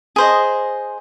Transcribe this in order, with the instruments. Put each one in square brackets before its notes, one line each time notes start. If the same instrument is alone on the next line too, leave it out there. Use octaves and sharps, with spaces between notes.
[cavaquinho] G#4 C5 D#5